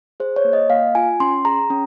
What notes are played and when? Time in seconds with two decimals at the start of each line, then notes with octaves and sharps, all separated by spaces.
0.20 G#4 C5
0.36 C#5
0.45 A#3
0.53 D#5
0.70 A#3 F5
0.95 F4 G#5
1.20 C#4 C6
1.45 G#4 A#5
1.70 C#4